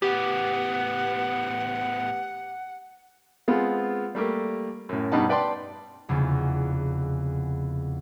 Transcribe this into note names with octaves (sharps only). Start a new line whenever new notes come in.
A2 B3 G4 F#5
G#3 B3 C4 F4
G3 A3 A#3 G4
F#2 A2
G2 B2 D#4 F#5 A5
B4 D5 G5 A5 C6
F1 E2 C#3